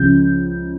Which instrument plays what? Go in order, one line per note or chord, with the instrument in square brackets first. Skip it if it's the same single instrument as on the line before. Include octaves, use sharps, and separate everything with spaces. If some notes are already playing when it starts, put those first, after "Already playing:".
Already playing: [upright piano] C#2 C#3 F3 G6